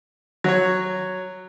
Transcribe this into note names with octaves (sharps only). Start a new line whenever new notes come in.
F#3 C#5